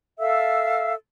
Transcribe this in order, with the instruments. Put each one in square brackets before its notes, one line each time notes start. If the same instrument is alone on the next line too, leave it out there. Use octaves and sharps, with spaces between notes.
[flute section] A4 E5 F5 E6